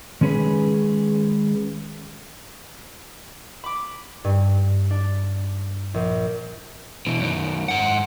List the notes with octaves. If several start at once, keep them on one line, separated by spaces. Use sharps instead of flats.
D#3 G#3 C#4 G#4 B4
B5 D6
G2
D4
A#1
B2 E3
F#2 D#3
G#2 F#5